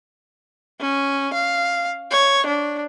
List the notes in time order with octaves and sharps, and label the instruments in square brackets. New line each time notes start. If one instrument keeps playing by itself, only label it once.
[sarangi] C#4
F5
C#5
D4